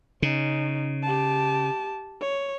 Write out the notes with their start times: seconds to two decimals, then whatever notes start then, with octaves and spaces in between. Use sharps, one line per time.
0.22 C#3 C#4 D#4
1.03 G4 A5
2.21 C#5